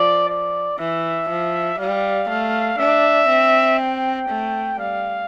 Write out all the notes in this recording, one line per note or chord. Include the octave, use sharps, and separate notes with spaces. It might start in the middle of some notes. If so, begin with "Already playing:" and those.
Already playing: F3 D5
D5
E3 E5
F3
G3 F5
A3
D4 E5
C4
G5
A3
G3 F5